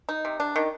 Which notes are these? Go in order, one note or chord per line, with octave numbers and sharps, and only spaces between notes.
D#4
C3
D4
D#3